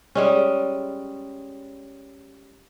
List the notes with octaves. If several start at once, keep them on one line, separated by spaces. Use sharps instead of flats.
G3 G#3 C#4